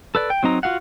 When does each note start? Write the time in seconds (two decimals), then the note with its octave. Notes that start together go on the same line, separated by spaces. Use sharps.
0.15 A4 B4 D5
0.30 G5
0.43 F#3 C4 D#4 A#5
0.63 F4 F#4 F5 F#5